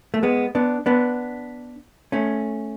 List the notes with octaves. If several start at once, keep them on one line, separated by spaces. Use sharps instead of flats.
A3
G#3 B3
B3 D4
B3 D4
A3 C#4